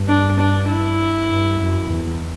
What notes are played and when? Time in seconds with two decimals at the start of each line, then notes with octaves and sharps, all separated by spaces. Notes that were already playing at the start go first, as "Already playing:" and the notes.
Already playing: G2
0.08 D4
0.39 D4
0.69 E4
1.29 G2
1.60 F#2
1.90 E2